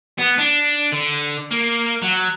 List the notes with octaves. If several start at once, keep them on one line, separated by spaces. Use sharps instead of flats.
B3
D4
D3
A#3
F#3